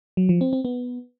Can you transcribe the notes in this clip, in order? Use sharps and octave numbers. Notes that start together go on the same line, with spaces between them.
F#3
F3
C4
C4
B3